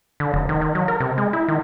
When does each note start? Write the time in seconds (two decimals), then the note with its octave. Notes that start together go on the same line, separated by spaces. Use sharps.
0.20 D3
0.34 F1
0.49 D#3
0.61 D#3
0.75 F#3
0.88 A#4
1.00 C3
1.18 G#3
1.33 E4
1.48 D#3